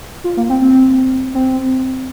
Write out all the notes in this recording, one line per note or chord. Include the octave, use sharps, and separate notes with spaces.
F4
A#3
C4
C4
C4